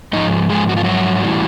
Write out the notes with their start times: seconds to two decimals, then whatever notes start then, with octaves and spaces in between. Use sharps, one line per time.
0.13 G#2 F3 G#3 D#4 D#5
0.49 G#3 G#4
0.69 F#4
0.77 F4
0.84 F#3 F#4
1.24 A2 E3 G3